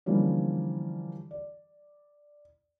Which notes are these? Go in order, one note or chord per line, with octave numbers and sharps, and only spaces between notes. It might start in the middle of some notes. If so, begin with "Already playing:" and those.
D3 E3 F3 G3 A#3 C#4
D5